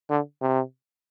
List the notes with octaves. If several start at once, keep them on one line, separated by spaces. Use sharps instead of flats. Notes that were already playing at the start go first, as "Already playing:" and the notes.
D3
C3